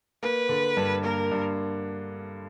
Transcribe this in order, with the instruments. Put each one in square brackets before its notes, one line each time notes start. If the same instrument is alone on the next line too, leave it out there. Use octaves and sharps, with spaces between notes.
[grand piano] A#3 [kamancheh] B4
[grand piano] D3
G2
[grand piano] A#3 [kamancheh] A#4
[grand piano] G2